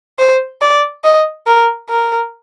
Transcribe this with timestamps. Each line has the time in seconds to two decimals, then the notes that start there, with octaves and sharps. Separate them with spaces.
0.19 C5
0.61 D5
1.04 D#5
1.47 A#4
1.89 A#4